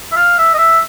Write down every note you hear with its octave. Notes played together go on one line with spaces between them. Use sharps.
E5
F5
E5
D#5
E5